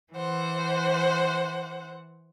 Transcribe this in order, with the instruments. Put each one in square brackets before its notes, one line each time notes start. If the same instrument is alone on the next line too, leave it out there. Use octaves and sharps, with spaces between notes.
[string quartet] E3 C5 F#5